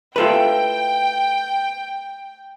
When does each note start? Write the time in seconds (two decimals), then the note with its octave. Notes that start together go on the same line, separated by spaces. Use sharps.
0.16 A3 E4 F4 A4 B4 G5